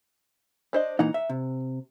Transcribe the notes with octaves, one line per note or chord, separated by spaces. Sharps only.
D4 C5 D#5
A#2 E3 D#4 F#5 A#5
E5
C3